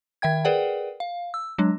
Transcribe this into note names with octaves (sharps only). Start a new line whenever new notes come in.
D#3 E5 G5 G#6
G#4 A#4 B4 D5 F#5 G5
F5
E6
F#3 G#3 D4